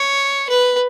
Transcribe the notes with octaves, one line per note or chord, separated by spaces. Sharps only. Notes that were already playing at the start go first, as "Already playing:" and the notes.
Already playing: C#5
B4